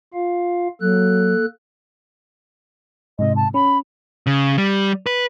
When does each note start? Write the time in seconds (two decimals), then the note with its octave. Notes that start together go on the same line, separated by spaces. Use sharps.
0.14 F4 F5
0.81 F#3 A#3 A4 F#6
3.19 G#2 C3 D#5
3.36 A5
3.54 C#4 B5
4.27 C#3
4.58 G3
5.06 B4